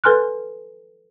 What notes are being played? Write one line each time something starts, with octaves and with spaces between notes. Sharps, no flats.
A4 B4 G#5 C6 F6 F#6